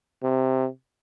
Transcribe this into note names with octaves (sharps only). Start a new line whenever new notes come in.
C3